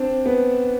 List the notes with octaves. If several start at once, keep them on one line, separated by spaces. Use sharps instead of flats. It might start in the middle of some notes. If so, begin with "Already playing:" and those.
Already playing: C4 D4
B3